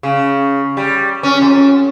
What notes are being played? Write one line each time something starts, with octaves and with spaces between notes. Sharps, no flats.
C#3
G3
C#4
F2